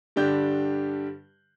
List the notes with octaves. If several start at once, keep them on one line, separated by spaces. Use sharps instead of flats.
G2 D3 G3 D4 G4 G6